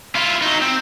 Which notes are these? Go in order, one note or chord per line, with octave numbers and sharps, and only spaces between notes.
E4 F4
F#3 D#4
C4